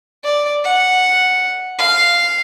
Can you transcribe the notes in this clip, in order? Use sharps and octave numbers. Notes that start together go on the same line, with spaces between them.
D5
F#5
F5